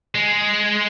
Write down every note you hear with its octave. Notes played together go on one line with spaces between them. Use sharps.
G#3